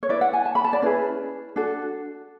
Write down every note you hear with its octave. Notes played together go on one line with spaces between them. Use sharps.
C#5
E4 B4 D5
F#5
G#5
A5
B5
A5
D5
C#4 E4 G#4 B4
D4 F#4 A4